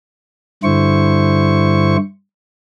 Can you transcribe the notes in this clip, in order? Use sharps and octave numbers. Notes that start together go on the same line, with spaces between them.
G2 D3 E4 C5 C#6